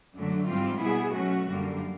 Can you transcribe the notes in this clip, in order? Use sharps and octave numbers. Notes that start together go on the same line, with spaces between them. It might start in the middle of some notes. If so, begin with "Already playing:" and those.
F#2 D3 F#3 A3 D4
G#2 E3 G3 C4 F4
B2 G3 B3 E4 G#4
F#3 A3 C#4 F#4
F#2 D3 G3 A#3